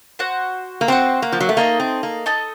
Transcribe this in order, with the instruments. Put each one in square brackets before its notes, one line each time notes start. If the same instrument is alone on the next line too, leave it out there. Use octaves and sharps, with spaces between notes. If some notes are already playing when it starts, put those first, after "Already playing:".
[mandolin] F#4 C5 F#5
[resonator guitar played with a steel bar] A#3
[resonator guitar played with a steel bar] C4 [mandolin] F#4 C5 F#5
[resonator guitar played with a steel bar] A#3
F3
F#3
A3
[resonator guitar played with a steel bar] A#3 [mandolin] D#4 A4 D#5
[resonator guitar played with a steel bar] C4
A#3
[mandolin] D#4 A4 D#5